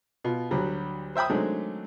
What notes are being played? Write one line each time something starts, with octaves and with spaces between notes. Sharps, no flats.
B2 F4
D2 F#3 G3
C5 E5 G5 B5 D#6
D#3 F#3 G#3 A3 C4 D4